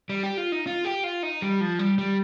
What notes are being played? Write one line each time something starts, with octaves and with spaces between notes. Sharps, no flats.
G3
G4
F4
D#4
F4
G4
F4
D#4
G3
F3
G3
G3